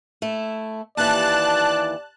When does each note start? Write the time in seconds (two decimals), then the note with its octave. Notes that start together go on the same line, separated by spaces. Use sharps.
0.22 A3 E4
0.97 D#2 E3 D5 A5 F#6